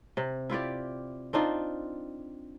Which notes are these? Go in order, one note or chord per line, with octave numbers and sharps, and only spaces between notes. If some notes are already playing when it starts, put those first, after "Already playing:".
C3
E4 F4 G4 D5
C4 D4 D#4 F4